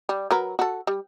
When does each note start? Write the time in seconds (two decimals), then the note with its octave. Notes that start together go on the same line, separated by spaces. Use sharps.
0.09 G3
0.31 F#3 A#4 B4
0.59 F#4 A4
0.87 G3